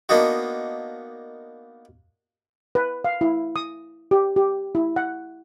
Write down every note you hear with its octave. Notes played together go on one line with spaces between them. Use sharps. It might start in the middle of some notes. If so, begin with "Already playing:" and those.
A#3 B3 D4 D#4 F#4
B4
F5
E4
D#6
G4
G4
E4
F#5